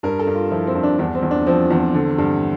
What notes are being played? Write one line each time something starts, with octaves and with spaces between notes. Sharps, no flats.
G2 A#4
A4
G2
F4
F3 E4
C4
G2
D4
E2 D4
C4
E2
D4
F3 C4
E2 C4
D3
G2